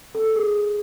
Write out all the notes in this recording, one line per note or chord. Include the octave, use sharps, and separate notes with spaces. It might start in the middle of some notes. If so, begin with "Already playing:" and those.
A4
G#4